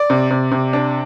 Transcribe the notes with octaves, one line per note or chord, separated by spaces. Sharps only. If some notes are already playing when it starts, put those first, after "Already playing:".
Already playing: D5
C3
C3
C3
D4